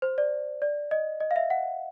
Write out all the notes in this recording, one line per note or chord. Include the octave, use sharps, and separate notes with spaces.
C5
D5
D5
D#5
D#5
F5
E5
F#5